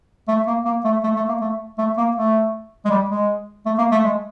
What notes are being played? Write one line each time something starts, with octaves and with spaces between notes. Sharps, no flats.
A3
A#3
A#3
A3
A3
A3
A#3
A3
A3
A#3
A3
G#3
G3
G#3
A3
A#3
A3
G#3